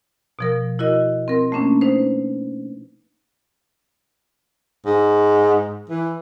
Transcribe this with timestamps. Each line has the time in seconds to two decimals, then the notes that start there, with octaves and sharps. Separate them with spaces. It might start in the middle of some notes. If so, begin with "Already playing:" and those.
0.39 B2 F3 A#4
0.79 E4 F#4 A#4 D#5
1.28 C4 A#4
1.52 A3 A#3 C#4 D4
1.81 D#4 B4 C5
4.85 G#2
5.90 E3